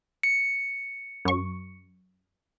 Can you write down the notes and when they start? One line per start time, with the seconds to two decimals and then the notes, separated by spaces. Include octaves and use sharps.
0.23 C#7
1.25 F#2 C#6